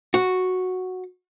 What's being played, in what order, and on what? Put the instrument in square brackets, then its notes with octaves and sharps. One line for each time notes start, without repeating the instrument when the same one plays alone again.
[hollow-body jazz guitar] F#4